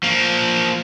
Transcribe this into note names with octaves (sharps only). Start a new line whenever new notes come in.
F3 A#3